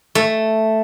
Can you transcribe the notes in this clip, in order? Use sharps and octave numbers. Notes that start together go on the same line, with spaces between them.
A3